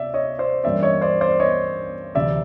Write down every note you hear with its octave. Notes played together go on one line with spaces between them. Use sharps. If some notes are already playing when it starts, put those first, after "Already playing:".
Already playing: C3 D5 E5
C#5 D#5
C5 D5
G2 E3 G3 A#3 C#4 D5 E5
C#5 D#5
C5 D5
C5 D5
C#5 D#5
D2 C3 E3 D5 E5